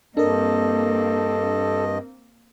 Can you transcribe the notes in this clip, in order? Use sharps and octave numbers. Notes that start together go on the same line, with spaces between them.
G2 A#3 C4 D4 A4 A#4 D#5